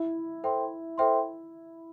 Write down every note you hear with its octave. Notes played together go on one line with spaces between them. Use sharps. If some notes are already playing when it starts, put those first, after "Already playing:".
Already playing: E4
A4 C5 E5 G5 C6
A4 C5 E5 G5 C6